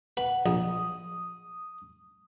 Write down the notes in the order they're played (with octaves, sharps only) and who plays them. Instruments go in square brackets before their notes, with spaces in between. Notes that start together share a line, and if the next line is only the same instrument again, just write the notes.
[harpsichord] B4 [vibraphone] F#5
[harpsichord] A#1 [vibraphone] D#6